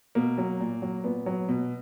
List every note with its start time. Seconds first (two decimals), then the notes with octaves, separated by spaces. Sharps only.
0.15 B2 A#3
0.38 F#3
0.60 A#2
0.82 F#3
1.04 A#2 B3
1.26 F#3
1.49 B2